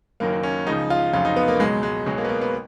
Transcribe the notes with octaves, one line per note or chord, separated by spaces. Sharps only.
F#1 F#2 D#3 F#3 A#3
C#4
C#2 C#3 F3 D#4
F4
F1 F2 C#3 F#3 F4
D#4
B3
A#3
C#2 B2 F#3 G#3
G#3
B1 B2 F#3 G#3
A#3
B3
A#3
B3